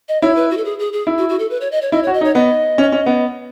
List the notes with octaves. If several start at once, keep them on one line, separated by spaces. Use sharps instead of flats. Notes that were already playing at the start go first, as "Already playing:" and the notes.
D#5
E4 C#5
B4
F#4
A4
G#4
G#4
G#4
E4
F#4
F#4
A4
B4
C#5
D#5
C#5
E4 D#5
C#5
F#4
D#5
D#4
C#5
B3 D#5
C#4
C#4
B3